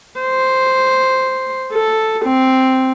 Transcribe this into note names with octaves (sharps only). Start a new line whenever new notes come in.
C5
A4
C4